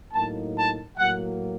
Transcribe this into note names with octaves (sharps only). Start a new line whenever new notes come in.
A2 F#3 A#3 D#4 A5
A5
A2 F#3 A#3 F#5